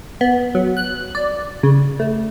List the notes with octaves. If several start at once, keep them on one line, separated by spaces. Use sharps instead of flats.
B3
F#3
F#6
D5
C#3
A3